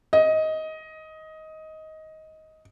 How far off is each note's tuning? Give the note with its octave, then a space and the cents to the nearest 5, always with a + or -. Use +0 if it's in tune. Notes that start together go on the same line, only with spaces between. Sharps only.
D#5 +15